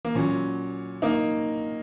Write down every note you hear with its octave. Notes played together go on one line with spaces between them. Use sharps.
A#3
A#2 F#3 C#4
A#3 D#4